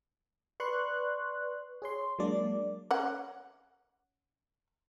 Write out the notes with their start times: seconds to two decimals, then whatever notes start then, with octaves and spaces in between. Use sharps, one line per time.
0.60 B4 D5 C6 C#6 F#6
1.82 G#4 C#5 C6
2.19 F#3 G#3 A#3 D4 D5
2.91 C#4 F#5